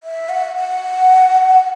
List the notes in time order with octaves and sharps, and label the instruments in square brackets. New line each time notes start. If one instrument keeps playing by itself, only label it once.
[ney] E5
F#5
F#5